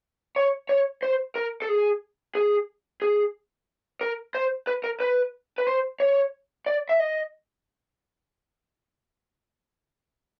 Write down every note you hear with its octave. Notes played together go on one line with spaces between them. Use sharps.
C#5
C#5
C5
A#4
A4
G#4
G#4
G#4
A#4
C5
B4
A#4
B4
B4
C5
C#5
D5
E5
D#5